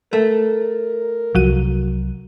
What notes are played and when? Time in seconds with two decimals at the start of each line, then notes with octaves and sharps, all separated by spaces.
0.13 A3 A#4
1.35 C2 F3 F#3 F#4 D#7